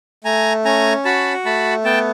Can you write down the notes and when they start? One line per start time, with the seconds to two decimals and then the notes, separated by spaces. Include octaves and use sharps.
0.24 A3 G#5 A#5
0.65 C#4 G#5 A#5
1.05 F#4 A5 B5
1.45 A3 A5 B5
1.85 B3 G5 A5